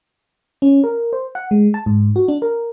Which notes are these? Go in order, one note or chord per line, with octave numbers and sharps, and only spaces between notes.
C#4
A#4
C5
F#5
G#3
A5
G#2
F#4
D4
A#4